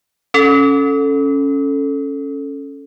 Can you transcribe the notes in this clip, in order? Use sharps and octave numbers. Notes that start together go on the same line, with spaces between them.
C#4 A4